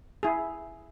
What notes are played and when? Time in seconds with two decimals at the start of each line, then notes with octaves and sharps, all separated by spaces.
0.23 E4 G#4